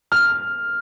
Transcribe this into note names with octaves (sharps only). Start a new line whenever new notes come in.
F6